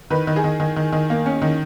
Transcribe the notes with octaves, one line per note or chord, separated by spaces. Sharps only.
D#3 B4
D#3
G#4
D#3
D#3
D#3
D#3
A#3
C#4
D#3